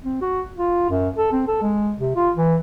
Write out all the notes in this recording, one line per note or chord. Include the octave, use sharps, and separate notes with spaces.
C4
F#4
F4
F#2
A4
C4
A4
G#3
C3
F4
E3